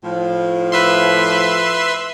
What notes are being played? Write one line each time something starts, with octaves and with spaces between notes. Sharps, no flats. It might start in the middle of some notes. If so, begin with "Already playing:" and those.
A2 F3
B4 E5 C6